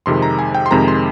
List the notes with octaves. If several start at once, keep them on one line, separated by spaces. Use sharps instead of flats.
F2 C3 D#3 G#3 C6
A#5
G#5
G5
C6
F2 C3 D#3 G#3 A#5
C6